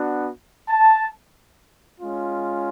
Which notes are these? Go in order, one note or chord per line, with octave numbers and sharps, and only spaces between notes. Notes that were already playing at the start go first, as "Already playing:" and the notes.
Already playing: B3 D4 F#4
A5
G#3 C#4 F4